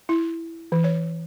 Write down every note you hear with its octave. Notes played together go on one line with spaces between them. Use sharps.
E4
E3
C#5